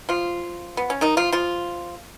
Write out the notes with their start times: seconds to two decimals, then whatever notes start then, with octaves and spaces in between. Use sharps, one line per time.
0.09 F3 F4
0.77 B3
0.90 C#4
1.01 D#3 D#4
1.17 F3 F4
1.32 F3 F4